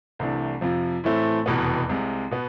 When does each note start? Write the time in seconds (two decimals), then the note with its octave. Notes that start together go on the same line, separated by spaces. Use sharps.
0.19 C2 C3 E3 A3 D4
0.61 F2 C3 F3
1.04 A2 E3 A3 C4
1.46 F1 E2 B2 B3
1.89 C2 C3 G#3
2.31 B2 B3